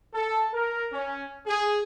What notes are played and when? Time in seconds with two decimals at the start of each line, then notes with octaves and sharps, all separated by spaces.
0.13 A4
0.53 A#4
0.92 C#4
1.46 G#4